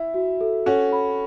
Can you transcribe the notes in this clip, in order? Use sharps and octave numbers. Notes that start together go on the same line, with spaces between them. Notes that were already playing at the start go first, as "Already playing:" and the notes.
Already playing: E4 E5
F#4
A4
C#4 F#4 A4
B5